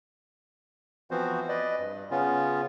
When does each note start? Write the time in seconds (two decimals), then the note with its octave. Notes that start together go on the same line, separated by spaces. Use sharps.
1.11 E3 F3 B3 C4 F#4 C5
1.49 B4 D5 D#5
1.79 G2
2.11 C#3 B3 C#4 F4